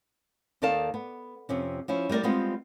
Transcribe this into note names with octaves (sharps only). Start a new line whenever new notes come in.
D#2 D#3 A4 D5 F5 A5
B3
F2 C3 C#4
F3 C#4 E4
G3 A3 C#4 A#4 D5
G3 G#3 B3 C4 F4